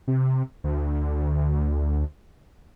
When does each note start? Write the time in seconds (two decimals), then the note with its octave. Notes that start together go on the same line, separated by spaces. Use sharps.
0.08 C3
0.64 D2